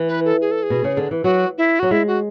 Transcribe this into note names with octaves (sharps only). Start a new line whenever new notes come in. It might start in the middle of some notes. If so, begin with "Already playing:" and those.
Already playing: E3
B4
A4
G#4
A4
G#4
B2
C#3
D3
E3
F#3 F#4
E4
F#3 F#4
G#3 E4
F#4